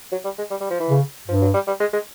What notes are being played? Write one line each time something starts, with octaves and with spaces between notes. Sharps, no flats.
F#3
G3
G#3
G3
G3
F3
E3
C#3
G2 F3
F#3
G3
G3
G#3
G#3